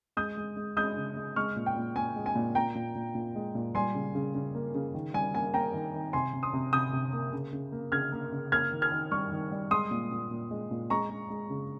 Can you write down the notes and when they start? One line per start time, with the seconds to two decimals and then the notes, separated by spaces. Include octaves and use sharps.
0.17 G#3 D#6 G6
0.37 G#3
0.57 G#3
0.77 G#3 D#6 G6
0.97 C#3
1.17 G#3
1.36 G#3 C#6 F6
1.56 A#2
1.66 G5
1.76 A#2
1.96 A#2 G#5
2.16 G#3
2.26 G#5
2.35 A#2
2.55 A#2 G5 A#5
2.75 A#2
2.95 A#2
3.15 A#2
3.35 G#3
3.55 A#2
3.75 G3 G#5 C6
3.95 C#3
4.15 C#3
4.34 C#3
4.55 A#3
4.75 C#3
4.94 D#3
5.14 G3 G#5
5.34 A#3 G#5
5.54 A#3 G5 A#5
5.74 D#3
5.94 D#3
6.13 C3 G#5 C6
6.33 C3
6.43 C6 D#6
6.53 C3
6.73 C3 D#6 G6
6.93 C3
7.13 A#3
7.33 C#3
7.53 C#3
7.72 A#3
7.92 C#3 F6 G#6
8.12 A#3
8.32 C#3
8.52 A#3 F6 G#6
8.72 D#3
8.82 F6 G#6
8.92 D#3
9.11 G3 C#6 F6
9.32 D#3
9.52 G3
9.71 G#3 C6 D#6
9.91 A#2
10.11 A#2
10.31 A#2
10.51 G#3
10.71 A#2
10.90 G#3 A#5 C#6
11.10 G#3
11.30 G#3
11.50 C#3